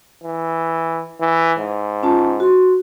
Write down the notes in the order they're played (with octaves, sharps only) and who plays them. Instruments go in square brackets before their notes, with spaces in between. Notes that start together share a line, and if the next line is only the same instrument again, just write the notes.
[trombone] E3
E3
G#2
[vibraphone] C#4 F4 A5
F#4 C6